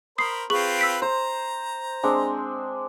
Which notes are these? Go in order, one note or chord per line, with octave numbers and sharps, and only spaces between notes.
A#4 C5 B5 D#6 C7
C4 F4 G#4 B4 C#6 F#7
E6 B6 D7
C5 A#5
G#3 C4 D4